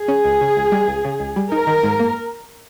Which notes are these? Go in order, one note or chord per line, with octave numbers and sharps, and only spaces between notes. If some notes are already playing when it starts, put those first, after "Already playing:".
Already playing: G#4
C#4
C#2
C#3
C#2
G3
C#2
C#3
C#2
G3
D#4 A#4
D#3
G#2
A#3